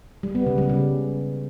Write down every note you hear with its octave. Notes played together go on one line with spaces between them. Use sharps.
G3
B3
C#3
G3
C#3